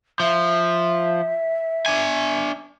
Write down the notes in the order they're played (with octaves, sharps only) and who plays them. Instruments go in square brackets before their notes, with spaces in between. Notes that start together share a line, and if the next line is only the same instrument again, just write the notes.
[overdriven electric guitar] F3 [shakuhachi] E5
[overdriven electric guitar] D4 G#5